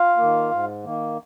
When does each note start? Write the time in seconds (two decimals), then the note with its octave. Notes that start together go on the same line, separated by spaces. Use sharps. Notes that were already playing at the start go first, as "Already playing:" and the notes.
Already playing: F4 F5
0.17 D#3 A#3
0.52 G#2
0.84 D#3 A#3